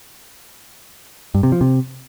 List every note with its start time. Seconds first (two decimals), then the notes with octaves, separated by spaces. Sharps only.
1.35 G2
1.43 C3
1.52 F3
1.61 C3